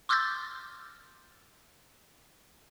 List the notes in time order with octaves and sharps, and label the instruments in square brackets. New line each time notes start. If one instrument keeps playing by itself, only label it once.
[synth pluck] C6 D6 E6 F6 G6 A6